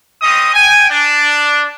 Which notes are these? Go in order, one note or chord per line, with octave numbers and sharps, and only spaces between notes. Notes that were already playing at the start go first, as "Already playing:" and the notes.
C4 C#4 D#5 D#6
G5 G#5
D4